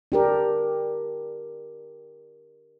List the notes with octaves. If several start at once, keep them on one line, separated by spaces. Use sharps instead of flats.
D4 G4 A#4